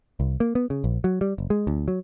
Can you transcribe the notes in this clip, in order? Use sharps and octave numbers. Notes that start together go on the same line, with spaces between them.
C2
A#3
B3
C#3
A#1
F#3
G3
F#1
G#3
D2
F#3